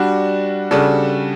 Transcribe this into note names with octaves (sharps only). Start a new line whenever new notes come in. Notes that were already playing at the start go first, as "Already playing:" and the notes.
Already playing: G3 D4 F#4
C#3 G3 D4 F#4 A4